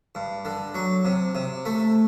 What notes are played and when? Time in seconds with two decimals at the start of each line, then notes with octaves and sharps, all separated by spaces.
0.15 G2
0.45 D3
0.74 F#3
1.05 C3
1.35 C3
1.65 A3